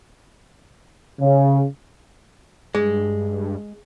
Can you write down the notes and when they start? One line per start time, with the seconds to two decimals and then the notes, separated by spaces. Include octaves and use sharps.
1.21 C#3
2.75 G2 G#3 G#4